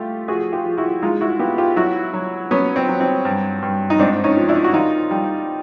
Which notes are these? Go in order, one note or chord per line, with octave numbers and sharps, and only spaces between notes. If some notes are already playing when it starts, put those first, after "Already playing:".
Already playing: A3 F4 G4
F3 F#4 G#4
F4 G4
F3
E4 F#4
G#3 D#4 F4
E4 F#4
B3 F4 G4
F4 G4
F#3 E4 F#4
F#3
F#3 B3 C#4
C4
F#3
C4
G2
G2
D#4
G#2 C4 D4
C#4 D#4
F3
D4 E4
F#4
D#3 D#4 F4
G3